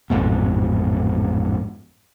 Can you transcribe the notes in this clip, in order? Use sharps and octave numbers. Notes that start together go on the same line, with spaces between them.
A1 F2 G#2 B2